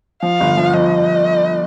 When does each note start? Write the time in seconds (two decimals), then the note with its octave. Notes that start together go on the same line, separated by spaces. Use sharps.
0.23 F3 F5
0.40 G1
0.57 F3
0.73 F3 D#5